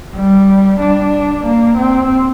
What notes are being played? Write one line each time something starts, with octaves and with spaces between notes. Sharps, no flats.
G3
D4
A#3
C4